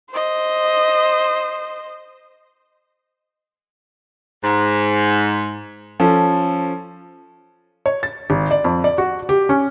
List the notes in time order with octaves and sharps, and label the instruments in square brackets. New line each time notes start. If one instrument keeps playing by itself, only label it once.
[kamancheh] C5 D#5
[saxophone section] G#2
[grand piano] F3 C#4 A4
[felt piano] C#5
A6
G#1
D5
F2
D5
F#4
G4
C#4